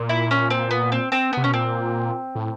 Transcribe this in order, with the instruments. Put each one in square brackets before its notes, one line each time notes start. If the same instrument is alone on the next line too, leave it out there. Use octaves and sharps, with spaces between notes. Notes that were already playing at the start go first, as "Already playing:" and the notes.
Already playing: [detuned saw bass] A#2
[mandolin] E4
C#4
C4
B3
C4
C4
[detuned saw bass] C3 [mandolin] B3
[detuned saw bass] B2 [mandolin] C#4
[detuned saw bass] A#2 [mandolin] C4
[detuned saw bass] A2